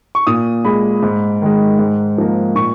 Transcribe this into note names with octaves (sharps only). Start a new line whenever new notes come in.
C#6
A#2 D#6
G#3 B5
G#2
D#3 G#3
G#2
F3 A#3
A#2 C#6